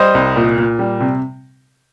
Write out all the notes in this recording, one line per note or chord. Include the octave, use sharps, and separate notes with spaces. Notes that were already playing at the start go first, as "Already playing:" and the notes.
Already playing: G3 C5 D#5
C2
A#2
A#2
G3
C3